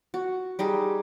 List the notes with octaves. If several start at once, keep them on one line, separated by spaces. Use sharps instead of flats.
F#4
G3 D#4 G4 G#4